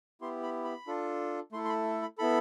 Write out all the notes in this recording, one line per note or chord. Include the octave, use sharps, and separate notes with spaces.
B3 E4 G4 C6
B5
B5
D4 F4 A4
A3 E4 A4 C6
C6
B5
B5
B3 E4 A4 B5